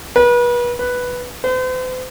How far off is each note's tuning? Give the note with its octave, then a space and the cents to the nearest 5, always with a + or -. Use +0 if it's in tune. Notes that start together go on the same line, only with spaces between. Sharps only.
B4 -35
B4 +0
C5 -45